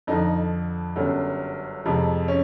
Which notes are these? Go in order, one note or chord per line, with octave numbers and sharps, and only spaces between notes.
F2 D3 F3 D#4
G1 F#2 D3 G3
F2 C3 F3 G#3
C#4